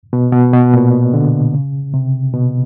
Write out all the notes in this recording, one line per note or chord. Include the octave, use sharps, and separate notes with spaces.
B2
B2
B2
A#2
D3
C#3
C3
B2